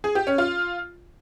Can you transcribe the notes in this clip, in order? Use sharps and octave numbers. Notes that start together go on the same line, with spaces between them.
G#4
G4
C#4
F4